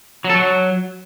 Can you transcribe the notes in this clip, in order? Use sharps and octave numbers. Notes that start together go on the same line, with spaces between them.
F#3
A4
F#3